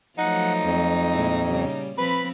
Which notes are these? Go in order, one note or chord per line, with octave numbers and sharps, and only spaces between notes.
F3 F#3 A3 D#4 F#5
F2
A#2 G#3 E4
C#3 G3
F3 C4 B4 B5